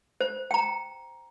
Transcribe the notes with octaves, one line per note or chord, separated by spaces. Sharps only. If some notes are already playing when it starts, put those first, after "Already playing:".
C5
G5 A#5